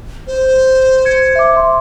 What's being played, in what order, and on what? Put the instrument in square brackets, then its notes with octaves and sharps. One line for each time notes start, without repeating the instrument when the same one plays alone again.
[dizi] C5
[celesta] G#6 C#7
E5 D6
E5 C6